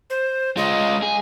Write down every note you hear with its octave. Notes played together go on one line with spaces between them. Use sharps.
C5
G#3 F4 D#5
G#4